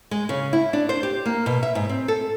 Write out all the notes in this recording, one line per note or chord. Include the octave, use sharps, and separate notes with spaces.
G#3
C#3
E4
D4
C5
G4
A#3
B2
E5
G#2
C4
A4